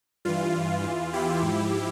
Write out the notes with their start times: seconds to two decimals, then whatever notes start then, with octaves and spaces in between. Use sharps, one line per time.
0.25 G2 E3 F4
0.84 E2 E3 F4
1.13 E4 G4
1.42 G#2 F3